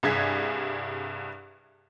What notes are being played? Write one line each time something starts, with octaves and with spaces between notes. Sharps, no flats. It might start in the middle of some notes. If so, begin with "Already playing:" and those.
C2 G2 G#4 G#6 B6